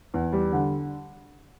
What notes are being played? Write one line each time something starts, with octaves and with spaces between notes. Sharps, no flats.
E2
G3
D3